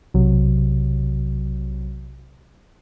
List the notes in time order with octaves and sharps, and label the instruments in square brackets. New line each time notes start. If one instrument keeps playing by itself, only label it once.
[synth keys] B1 C3 F#3